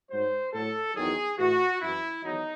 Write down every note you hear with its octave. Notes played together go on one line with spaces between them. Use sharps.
G#2 F#3 C5
A2 F#3 A4
E2 D#3 F#3 G#4
A2 E3 F#4
F#2 E3 E4
E2 D#3 F#3 D#4